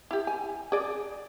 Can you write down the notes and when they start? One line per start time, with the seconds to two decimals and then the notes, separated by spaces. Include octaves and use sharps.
0.11 E4 G4
0.27 G#5
0.72 G#4 D5